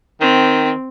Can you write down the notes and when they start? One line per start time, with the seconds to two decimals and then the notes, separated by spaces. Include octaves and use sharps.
0.21 D#3 C4